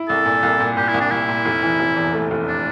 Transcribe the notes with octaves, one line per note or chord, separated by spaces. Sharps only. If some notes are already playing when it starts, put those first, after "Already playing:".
Already playing: E4
C2 A4
A#2
C2
A#2
A#2 G4
E4
C2
D4
C2 E4
A#2
F1
E3
F1
E2
A3
F1
D4